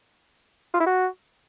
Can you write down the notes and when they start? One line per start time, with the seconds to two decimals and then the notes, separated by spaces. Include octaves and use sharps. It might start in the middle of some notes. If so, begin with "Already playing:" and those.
0.74 F4
0.80 E4
0.86 F#4